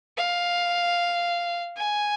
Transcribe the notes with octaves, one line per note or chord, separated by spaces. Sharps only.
F5
G#5